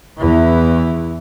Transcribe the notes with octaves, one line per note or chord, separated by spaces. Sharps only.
E2 E3